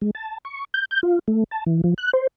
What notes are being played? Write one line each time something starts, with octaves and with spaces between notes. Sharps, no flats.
G#3
A5
C#6
G6
G6
F4
A3
A5
E3
F3
F#6
C5